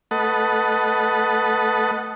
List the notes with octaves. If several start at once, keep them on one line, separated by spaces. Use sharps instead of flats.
A3 A4 B4 D#5 F#5